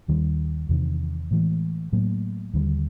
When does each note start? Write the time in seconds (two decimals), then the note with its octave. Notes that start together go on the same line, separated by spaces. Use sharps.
0.08 D#2 D#3 G3
0.69 E2 C3 D#3
1.31 A2 E3 G#3
1.92 A2 F#3 A#3
2.53 D#2 D3 G3